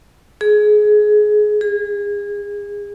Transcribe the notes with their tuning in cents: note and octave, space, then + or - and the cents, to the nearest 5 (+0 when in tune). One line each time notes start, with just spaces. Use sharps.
G#4 +20
G#4 -30